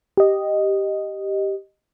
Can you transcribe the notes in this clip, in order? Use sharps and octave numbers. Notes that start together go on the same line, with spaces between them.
G4 D#5